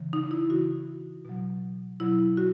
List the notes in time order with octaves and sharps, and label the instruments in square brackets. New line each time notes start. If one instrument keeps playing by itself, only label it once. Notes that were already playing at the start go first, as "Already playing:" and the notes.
Already playing: [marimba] C#3 E3
D#4
E4
C#3 E3 F#4
B2 F#3
B2 F#3 E4
F#4